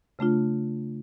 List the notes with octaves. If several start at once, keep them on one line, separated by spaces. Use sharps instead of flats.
C#3 A3 D4 F4